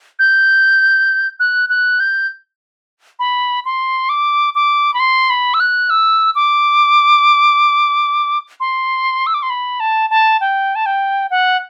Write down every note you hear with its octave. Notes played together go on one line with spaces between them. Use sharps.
G6
F#6
F#6
G6
B5
C6
D6
D6
B5
C6
B5
E6
F#6
E6
D6
C6
E6
D6
C6
B5
A5
A5
G5
A5
G5
F#5